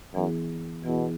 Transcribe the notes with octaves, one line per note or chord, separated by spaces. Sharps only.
F#2 E3 B3 E4 G#4
B2 E3 B3 E4 G#4